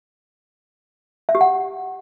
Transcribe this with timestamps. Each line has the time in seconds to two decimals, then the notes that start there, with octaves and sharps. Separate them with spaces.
1.29 E5
1.35 G4
1.41 F#5